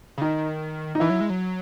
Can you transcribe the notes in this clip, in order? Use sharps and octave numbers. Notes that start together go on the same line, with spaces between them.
C#3
D#3 D#4
D#4
E3 E4
F#3
G#3
F#3